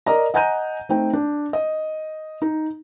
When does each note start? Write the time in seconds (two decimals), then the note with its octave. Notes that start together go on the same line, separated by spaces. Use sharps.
0.06 A#4 D5 D#5 A#5
0.34 D#5 F#5 G#5 A#5 G6 D#7
0.89 A3 C4 D#4 G5
1.13 D4
1.53 D#5
2.42 D#4